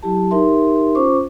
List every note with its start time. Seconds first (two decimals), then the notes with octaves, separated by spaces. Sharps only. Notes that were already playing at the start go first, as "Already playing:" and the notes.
0.03 F#3 E4 G4 A5
0.31 D#4 G4 A#4 E5 C6
0.95 C#4 F4 C5 C#6 D6